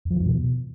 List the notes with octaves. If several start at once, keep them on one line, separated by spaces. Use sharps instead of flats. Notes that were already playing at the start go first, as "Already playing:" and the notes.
E2
F3
E3
E2
B2